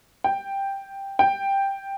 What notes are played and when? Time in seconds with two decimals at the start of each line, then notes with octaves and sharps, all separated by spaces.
0.24 G5
1.19 G5